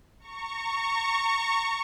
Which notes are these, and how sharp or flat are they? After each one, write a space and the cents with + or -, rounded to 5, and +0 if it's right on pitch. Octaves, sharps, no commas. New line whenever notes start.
A#5 -30 C#6 +0